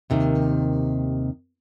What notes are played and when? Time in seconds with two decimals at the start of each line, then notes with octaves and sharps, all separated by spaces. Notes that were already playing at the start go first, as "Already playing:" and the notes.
0.10 D#2 C3 D#3